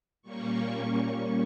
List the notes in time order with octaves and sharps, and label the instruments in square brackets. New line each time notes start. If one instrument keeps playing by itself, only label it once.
[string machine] A#2 G3 A#3 C#4 C#6